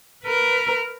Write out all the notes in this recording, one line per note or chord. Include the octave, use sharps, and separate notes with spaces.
A#4 B4